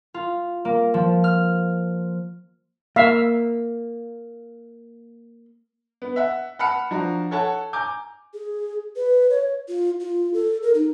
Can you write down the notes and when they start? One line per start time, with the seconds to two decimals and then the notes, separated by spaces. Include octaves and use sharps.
0.14 F4
0.65 A#3
0.94 F3
1.24 F6
2.96 A#3 E5 F5
6.02 B3
6.16 E5 F#5
6.59 F#5 A5 B5 F6 C#7
6.91 F3 D4 F#4 A#5
7.31 A4 C#5 F#5 A5
7.73 G#5 A#5 D6 G6
8.34 G#4
8.96 B4
9.30 C#5
9.68 F4
10.00 F4
10.34 A4
10.63 A#4
10.75 D#4